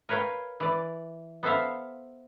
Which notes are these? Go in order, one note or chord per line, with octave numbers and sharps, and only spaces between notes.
A#4 B4 C#5 F5 G5
E3 D5
B3 A4 C5 E5 F5